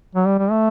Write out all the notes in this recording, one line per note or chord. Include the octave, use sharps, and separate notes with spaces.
F#3
G3
G3
A3